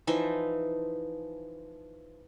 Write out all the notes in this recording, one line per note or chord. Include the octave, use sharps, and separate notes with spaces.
E3 F3 D#4 E5